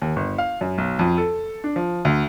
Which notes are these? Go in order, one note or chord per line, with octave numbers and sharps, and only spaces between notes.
D#2
G1
F5
F#2
B1
F2
A4
D4
F3
D2